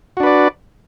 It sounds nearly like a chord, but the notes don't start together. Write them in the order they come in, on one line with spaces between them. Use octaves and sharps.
F#4 D4 B4 D5